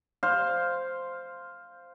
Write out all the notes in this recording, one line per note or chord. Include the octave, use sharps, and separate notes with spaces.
C5 F5